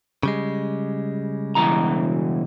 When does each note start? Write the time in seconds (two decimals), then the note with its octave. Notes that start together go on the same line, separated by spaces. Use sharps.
0.23 C#3 G3 G#3
1.55 B2 E3 A#5